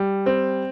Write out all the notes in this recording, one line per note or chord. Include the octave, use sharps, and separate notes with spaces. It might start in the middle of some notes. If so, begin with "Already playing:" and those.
Already playing: G3
C4